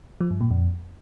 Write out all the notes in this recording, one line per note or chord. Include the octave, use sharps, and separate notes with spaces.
F3
G2
A#2
F2